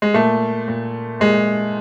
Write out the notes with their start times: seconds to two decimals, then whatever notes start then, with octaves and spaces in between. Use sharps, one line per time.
0.02 G#3
0.14 A#2 A3
0.68 A#2
1.20 A#2 G#3